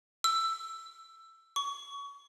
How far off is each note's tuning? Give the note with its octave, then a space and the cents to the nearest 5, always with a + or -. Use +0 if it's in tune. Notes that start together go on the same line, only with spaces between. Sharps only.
E6 +10
C#6 +25